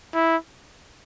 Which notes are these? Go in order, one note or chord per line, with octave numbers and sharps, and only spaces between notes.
E4